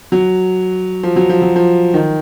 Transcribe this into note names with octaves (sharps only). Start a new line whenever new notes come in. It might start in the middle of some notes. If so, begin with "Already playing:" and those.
F#3
F3
F#3
F3
F#3
F3
D#3